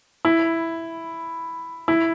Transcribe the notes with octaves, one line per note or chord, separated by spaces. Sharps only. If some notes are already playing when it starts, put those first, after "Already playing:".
E4
E4